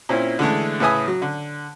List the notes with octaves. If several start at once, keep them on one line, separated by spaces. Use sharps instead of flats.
A#2 C4 C#4 E4
D3 E3 G#3 A3
A2 C#3 B4 E5 G#5 D#6
F#3
D3